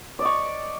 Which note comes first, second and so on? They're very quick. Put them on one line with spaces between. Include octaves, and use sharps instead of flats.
D5 D#5 C#6